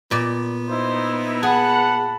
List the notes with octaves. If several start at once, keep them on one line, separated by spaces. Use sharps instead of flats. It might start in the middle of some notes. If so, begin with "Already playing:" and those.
A#2 B3 D5
D#4 E4 C5
G#4 F#5 A5 B5